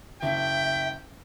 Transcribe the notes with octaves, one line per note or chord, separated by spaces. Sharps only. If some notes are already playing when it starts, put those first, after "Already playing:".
F#1 E5 G5